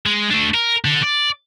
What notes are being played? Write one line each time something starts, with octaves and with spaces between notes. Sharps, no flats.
G#3
A3 D4
A#4
D3
D5